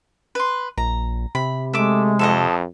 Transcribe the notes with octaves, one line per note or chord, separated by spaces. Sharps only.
B4 C6
A#1 A#5
C3 B5
G#3 A3 E5 D6
F2 A4 C#5 D#5